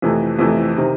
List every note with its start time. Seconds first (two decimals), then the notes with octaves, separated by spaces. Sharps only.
0.02 F2 C3 E3 A3
0.39 F2 C3 E3 A3
0.77 C3 D#3